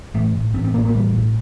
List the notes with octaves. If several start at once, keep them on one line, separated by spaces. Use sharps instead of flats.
A1 A3
A2
A1 C4
C4
A2 A#3
A#3
A1 G3
A2